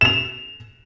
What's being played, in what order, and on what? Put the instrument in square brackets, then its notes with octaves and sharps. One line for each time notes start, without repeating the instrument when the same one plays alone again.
[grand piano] E7 F7